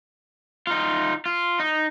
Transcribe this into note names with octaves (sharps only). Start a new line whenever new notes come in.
D#4 F4
F4
D#4